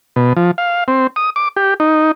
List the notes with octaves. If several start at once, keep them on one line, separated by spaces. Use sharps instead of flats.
B2
F3
F5
C4
D#6
D6
G4
D#4